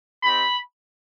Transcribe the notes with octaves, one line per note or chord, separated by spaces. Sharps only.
C4 D#4 G4 B5